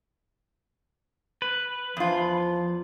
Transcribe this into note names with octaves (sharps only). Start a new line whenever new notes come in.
B4
E2 F3 F4